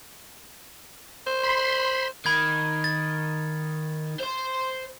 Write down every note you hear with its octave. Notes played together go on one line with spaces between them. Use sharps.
C5
B5 C6
D#3 B5 G#6
A6
C5 C6